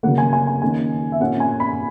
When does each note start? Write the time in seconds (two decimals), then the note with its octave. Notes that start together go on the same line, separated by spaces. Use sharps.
0.03 C#3 F#3 A#3 F#5
0.18 G#5
0.33 G#5
0.47 G#5
0.62 D#3 A#3 C#4 G#5
1.12 E5
1.20 A#2 A#3 C#4 F#5
1.40 G#5
1.60 B5